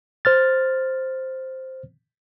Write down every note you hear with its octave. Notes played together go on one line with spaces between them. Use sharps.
C5 F6 A6